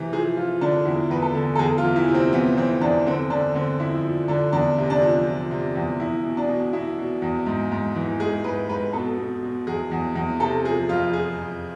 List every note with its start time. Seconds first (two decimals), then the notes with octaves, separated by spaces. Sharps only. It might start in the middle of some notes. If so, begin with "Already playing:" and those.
Already playing: C3 E3
0.13 F3 G#4
0.37 F3 F4
0.61 D3 D4
0.85 E2 E4
1.10 E2 B4
1.22 A4
1.35 D3
1.56 A4
1.59 E2 G#4
1.78 F4
1.84 E3
1.96 E4
2.08 C3
2.15 C4
2.32 E3 B3
2.57 E3 C4
2.81 E2 D4
3.07 D3 C4
3.30 D3 D4
3.55 D3 C4
3.80 F2 E4
4.05 F3
4.28 D3 D4
4.53 E2 D4
4.78 C3
4.90 D4
5.02 F3
5.26 F3
5.51 C3
5.75 E2
5.99 E2 E4
6.24 B2
6.37 D4
6.49 B2
6.73 B2 E4
6.98 B2
7.22 E2
7.46 G#2
7.72 G#2
7.96 E3
8.20 G#2 G#4
8.44 G#2 B4
8.68 G#2 B4
8.93 B2 A4
9.18 B2
9.43 B2
9.67 E2 G#4
9.91 E2
10.15 E2
10.40 C3 A4
10.64 F3 G#4
10.89 F2 F4
11.13 F3 G#4
11.38 F2